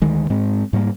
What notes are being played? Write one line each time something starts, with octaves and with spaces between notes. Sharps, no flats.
D2 D#3 G#3
G#2 G#3 C4
G#2 G3 A#3